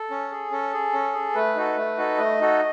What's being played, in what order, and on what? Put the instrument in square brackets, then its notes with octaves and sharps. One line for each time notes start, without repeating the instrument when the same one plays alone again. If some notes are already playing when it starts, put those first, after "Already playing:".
Already playing: [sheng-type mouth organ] A4
C#4
G#4
C#4 A4
G#4
C#4
G#4
A3 B4
D#4 F#4 A4
A3
D#4 F#4 A4
A3 D#5
D#4 F#4 A4